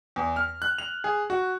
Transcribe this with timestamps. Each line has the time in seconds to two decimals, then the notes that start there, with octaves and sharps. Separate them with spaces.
0.16 E2
0.36 F6
0.62 F#6
0.78 F7
1.04 G#4
1.30 F#4